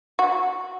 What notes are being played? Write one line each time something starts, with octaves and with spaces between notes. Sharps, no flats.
F#4